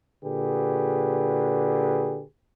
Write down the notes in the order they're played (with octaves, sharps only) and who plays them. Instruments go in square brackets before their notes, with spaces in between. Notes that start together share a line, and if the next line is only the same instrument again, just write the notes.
[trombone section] A#2 D3 G4 G#4 B4